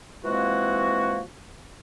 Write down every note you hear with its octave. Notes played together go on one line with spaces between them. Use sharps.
E3 F3 G#3 A#3 C4 F#4